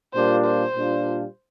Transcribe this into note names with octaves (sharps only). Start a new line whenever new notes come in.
A#2 G3 A#3 D4 F4 C5
C5
A#2 G3 D4 F4